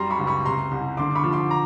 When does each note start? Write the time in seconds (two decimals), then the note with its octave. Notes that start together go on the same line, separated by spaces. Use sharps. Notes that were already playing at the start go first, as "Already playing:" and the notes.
Already playing: F#2 G3 A#5 C6
0.10 B5 C#6
0.19 C#2
0.27 B5 C#6
0.45 C3 A#5 C6
0.71 C2
0.97 D3 C6 D6
1.16 B5 C#6
1.24 F3
1.33 C6 D6
1.51 A#5